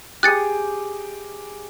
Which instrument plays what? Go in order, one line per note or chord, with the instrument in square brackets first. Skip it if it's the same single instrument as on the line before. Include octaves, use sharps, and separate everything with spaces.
[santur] G4 G#4 D#6 [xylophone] F#6 A6 C#7